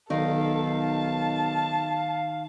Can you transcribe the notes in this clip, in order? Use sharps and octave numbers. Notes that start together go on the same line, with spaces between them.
B1 D#3 A4 F5
A5